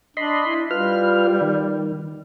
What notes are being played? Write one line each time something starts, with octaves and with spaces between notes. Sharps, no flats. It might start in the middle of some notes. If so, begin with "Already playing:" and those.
D4 D#5 B5 C6
E4
G3 F4 B4 F6
D#3